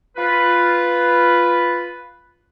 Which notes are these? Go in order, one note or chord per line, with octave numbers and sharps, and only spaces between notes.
F4 B4